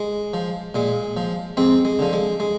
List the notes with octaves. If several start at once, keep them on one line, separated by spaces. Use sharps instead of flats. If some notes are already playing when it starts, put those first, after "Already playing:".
Already playing: G#3
F3
A#2 G#3
F3
F2 G#3 C4
G#3
D3 F3
G#3
G#3